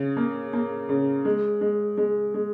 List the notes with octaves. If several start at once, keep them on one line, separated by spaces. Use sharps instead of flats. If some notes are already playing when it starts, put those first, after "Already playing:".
Already playing: C#3
A#3
A#3
C#3
G#3
G#3
G#3
G#3